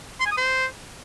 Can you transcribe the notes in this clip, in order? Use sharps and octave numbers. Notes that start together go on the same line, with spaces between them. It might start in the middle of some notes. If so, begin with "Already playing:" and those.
C6
G#5
D#6
C5